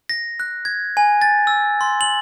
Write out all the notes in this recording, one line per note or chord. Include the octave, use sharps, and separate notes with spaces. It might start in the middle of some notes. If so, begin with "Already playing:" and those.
A#6
F#6
G#6
G#5
A6
E6
C6
F#7